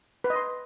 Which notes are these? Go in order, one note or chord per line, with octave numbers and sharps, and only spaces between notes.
B4
D#5
C6